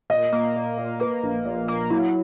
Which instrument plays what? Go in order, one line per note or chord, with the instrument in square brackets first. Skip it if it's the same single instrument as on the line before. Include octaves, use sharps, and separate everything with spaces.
[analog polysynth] A#2 [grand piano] D#5
[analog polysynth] A#3
A#2
A#2
[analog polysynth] A#3 [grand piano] B4
[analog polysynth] A#1
A#2
A#3
[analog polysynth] F#3 [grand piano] E4